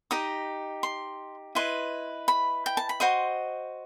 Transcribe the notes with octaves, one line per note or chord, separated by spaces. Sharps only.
D#4 G4 D#5 D#6
C6
E4 B4 D#5 C6
B5
G5
A5
B5
F#4 C5 D#5 C6